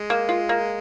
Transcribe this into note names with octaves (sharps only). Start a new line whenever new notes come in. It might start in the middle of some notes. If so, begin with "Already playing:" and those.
Already playing: G#3
A#3
F4
A#3